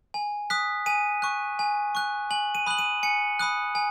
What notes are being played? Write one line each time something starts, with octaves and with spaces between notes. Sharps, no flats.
G#5
D#6 F#6 B6
G#5 D#7
C#6 F#6
G#5
C#6 F#6
G#5 F#7
D#7
B5 D#6 F#6 F#7
D#7
G#5 C#7
B5 D#6 F#6
G#5